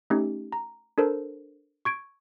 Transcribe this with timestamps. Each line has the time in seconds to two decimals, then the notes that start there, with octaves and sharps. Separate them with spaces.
0.10 A3 C#4 D#4 G4
0.52 A#5
0.98 D4 A4 A#4 C5
1.85 C#6 G#6 D7